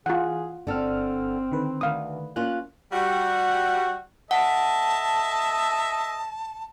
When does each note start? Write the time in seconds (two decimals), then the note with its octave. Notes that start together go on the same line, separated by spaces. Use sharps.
0.06 E3 F4 G#4 F#5
0.67 G1 D3 C4 A4 F6
1.52 D3 D#3 B4
1.81 D2 A#4 F5 D#6
2.36 A#3 C#4 F4 F#6
2.92 G3 F#4 F#5
4.31 A4 D#5 E5 F#5 A5